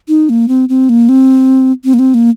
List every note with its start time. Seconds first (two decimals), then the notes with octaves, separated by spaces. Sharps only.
0.08 D#4
0.29 A#3
0.48 C4
0.69 C4
0.89 A#3
1.09 C4
1.85 C4
1.94 A#3
1.99 C4
2.14 A#3